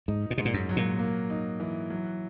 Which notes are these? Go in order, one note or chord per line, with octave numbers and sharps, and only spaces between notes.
G#2 D#4
A#2
G#2 B2
A#2
F#2
F#3
A#2
A#3
D#4
E3
F#3